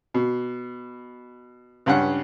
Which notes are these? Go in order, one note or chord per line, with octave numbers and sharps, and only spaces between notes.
B2
C#2 G2 C#4 F#5